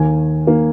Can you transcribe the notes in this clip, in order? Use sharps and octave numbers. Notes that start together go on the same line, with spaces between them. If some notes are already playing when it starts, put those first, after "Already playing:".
Already playing: D#2 D#3 A#3 G#5
D#3 A#3